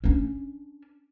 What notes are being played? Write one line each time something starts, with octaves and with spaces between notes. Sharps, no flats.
C#4 D4